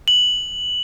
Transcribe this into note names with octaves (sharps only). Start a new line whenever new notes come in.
F#7